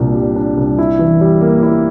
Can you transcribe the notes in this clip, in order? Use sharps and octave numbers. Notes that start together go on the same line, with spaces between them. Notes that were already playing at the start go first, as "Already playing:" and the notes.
Already playing: C2 A#2 D4
G3
D4
C2
E4
E3
G3
A#3
E4